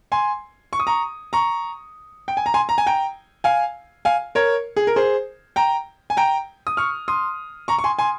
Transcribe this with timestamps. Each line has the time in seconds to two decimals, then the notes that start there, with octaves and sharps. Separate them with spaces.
0.12 G#5 C6
0.73 C#6
0.80 D#6
0.87 A#5 C#6
1.33 A#5 C#6
2.28 G5
2.37 G#5
2.46 A#5
2.54 G#5 C6
2.69 A#5
2.78 G#5
2.86 G5 A#5
3.44 F5 G#5
4.05 F5 G#5
4.35 A#4 C#5
4.76 G#4
4.87 A#4
4.96 G#4 C5
5.56 G5 A#5
6.10 G#5
6.17 G5 A#5
6.67 D#6
6.77 C#6 F6
7.08 C6 D#6
7.68 A#5 C#6
7.79 C#6
7.84 G#5 C6
7.99 G#5 C6